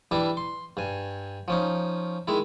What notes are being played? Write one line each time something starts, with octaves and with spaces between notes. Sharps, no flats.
E3 G3 D4 E4
C6
G2 G#5
F3 C#4 D#4
D#3 G#3 E4